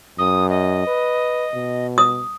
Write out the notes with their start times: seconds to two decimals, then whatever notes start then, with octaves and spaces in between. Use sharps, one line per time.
0.18 F#2 D#6
0.49 D#5
0.87 B4
1.54 B2
1.98 D#6